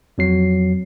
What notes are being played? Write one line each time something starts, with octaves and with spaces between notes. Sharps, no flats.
F2 F#3 C7